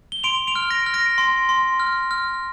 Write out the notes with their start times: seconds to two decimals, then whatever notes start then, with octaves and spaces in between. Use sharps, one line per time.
0.12 G7
0.23 C6 D7 F7
0.47 D7 F7
0.55 F6
0.70 A#6 D7
0.86 F6
0.94 A#6 D7
1.18 C6
1.49 C6
1.80 F6
2.11 F6